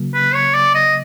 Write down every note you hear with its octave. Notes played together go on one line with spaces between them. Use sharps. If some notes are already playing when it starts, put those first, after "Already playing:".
Already playing: C#3 F#3 A#3
B4
C#5
D5
D#5